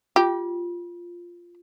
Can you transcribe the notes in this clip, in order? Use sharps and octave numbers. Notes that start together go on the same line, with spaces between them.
F4 G4